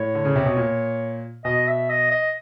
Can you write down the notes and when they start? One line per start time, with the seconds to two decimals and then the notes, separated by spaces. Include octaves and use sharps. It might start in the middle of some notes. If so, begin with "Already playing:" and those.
Already playing: A2 C#5
0.15 D3
0.25 C#3
0.36 C3
0.46 B2
0.57 A#2
1.45 B2 D#5
1.67 E5
1.89 D#5
2.11 D#5